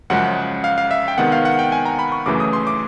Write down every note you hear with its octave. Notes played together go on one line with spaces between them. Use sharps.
F#2 C#3 F3 G#3 F#5
F5
F5
E5
G5
C3 D#3 G#3 B3 F#5
F5
F#5
G5
G#5
A#5
B5
C#6
F#2 C#3 E3 A3 D6
D#6
C6
D6